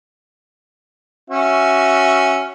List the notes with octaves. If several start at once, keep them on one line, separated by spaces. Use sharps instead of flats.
C#4 F#4 E5